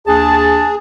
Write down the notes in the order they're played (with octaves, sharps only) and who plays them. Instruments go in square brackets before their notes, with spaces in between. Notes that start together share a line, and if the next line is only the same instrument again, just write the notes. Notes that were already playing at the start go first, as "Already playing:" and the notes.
[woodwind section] D#2 D4 A5 [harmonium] G#4